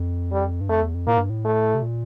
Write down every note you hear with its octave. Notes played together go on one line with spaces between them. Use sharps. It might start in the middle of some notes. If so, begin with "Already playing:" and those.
Already playing: F2
G3
G2
F2 A3
E2
F2
A2 A#3
G2
A2
A3
C3
A#2